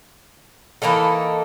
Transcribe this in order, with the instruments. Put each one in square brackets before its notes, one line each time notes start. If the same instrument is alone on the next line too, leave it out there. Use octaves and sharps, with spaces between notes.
[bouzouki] E3 A#3 D#4 A4